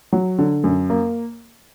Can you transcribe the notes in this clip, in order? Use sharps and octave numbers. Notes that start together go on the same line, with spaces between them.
F#3
D3
F#2
A#3